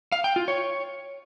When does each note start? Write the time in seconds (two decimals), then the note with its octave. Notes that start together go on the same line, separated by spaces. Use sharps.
0.12 F5
0.24 G5
0.36 F4
0.48 C#5